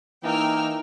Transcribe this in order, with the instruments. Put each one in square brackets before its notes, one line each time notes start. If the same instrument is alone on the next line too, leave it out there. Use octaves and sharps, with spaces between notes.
[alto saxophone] E3 [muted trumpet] A#3 [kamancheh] D#4 [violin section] G5 E6 F6